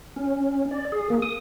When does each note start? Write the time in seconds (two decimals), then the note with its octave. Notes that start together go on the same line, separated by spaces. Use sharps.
0.16 C#4
0.71 D5
0.92 G#4
1.10 A#3
1.22 D#6